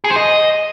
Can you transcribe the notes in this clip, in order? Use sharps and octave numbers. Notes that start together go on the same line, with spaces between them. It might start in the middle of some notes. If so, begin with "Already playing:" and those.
G#4
C5
D#5